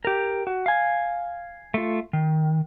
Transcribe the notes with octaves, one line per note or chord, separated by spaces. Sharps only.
G4 A#4
F#4
F5 G#5
A3 F4
D#3